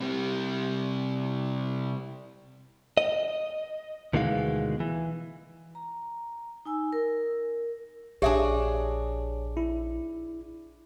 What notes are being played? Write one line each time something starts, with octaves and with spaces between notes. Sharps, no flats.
C3 G3
D#5
D2 B2 D#3 E3 G#3 F5
E3
A#5
D#4 G#5 E6
A#4
A#1 D4 G4 G#4 C#5 D5 E5
E4